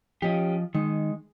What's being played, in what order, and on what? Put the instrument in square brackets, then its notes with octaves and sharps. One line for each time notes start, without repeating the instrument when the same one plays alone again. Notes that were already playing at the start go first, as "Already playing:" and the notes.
[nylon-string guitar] F3 D#5 [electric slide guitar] C#4 G4
[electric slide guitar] D#3 [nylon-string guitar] G#3